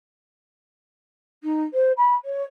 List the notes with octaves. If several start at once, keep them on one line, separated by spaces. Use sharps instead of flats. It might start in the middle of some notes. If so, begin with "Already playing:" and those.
D#4
C5
B5
C#5